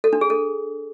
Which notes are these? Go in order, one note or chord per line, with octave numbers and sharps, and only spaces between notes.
A4
D4
G#4
A4